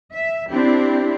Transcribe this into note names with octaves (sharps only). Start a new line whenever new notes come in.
E5
C4 D4 E4 G4